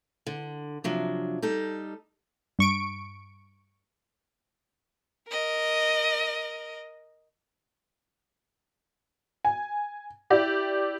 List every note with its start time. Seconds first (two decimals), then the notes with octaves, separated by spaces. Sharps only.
0.27 D3
0.84 C3 F3 F#3 D4
1.42 G3 D#4 A4
2.59 G2 C#6 D7
5.28 A#4 D#5
9.45 G#5
10.30 E4 G4 D5